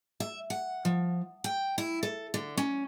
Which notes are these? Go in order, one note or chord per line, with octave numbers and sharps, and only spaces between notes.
E5
F#5
F3
G5
E4
A4
D3
C#4